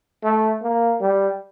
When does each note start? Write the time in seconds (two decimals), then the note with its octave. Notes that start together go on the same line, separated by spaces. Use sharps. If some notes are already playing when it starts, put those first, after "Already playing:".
0.23 A3
0.62 A#3
1.01 G3